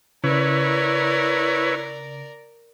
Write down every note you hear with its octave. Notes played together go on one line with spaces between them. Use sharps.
C#3 E4 A#4 B4 C#5 D5